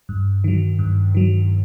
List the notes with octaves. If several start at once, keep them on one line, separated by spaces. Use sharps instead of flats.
G2
D#3 F#3
G2
D#3 F#3